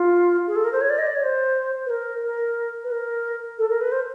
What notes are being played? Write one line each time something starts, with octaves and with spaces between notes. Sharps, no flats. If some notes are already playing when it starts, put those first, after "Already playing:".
Already playing: F4
G#4
A4
A#4
C5
C#5
D5
D#5
D5
C#5
C5
B4
A#4
A#4
B4
A#4
A4
A#4
B4
C5